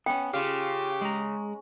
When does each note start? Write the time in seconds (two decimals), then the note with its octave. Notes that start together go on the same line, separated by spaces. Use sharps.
0.06 B3 C#4 G5
0.34 C#3 F4 G4 F5
1.01 G#3 A#5